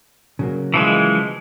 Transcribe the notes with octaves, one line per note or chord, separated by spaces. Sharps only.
C#3 F#3 A#3
E3 F3 G#3